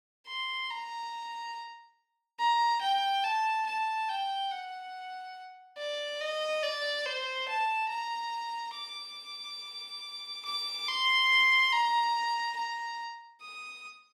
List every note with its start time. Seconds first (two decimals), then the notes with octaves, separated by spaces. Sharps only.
0.27 C6
0.70 A#5
2.40 A#5
2.82 G5
3.24 A5
3.67 A5
4.09 G5
4.51 F#5
5.78 D5
6.21 D#5
6.63 D5
7.06 C5
7.48 A5
7.90 A#5
8.76 D6
10.45 D6
10.87 C6
11.72 A#5
12.57 A#5
13.42 D#6